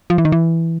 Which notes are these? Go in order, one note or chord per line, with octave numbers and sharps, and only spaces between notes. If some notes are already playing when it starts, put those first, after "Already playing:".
F3
E3
D#3
E3